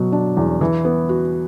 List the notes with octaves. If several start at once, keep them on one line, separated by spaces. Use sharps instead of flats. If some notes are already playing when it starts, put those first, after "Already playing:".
Already playing: B2 F#3
D4
E2
E3
B3
F#4